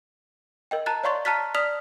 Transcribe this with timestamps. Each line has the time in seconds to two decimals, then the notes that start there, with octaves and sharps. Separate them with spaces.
0.71 A#4 D#5 G5
0.86 A5 A#5 F#6 A6
1.04 C#5 D5 F5 C6 C#6 A6
1.25 A5 A#5 F6 F#6 A6 B6
1.54 D5 D#6 F6 B6 F7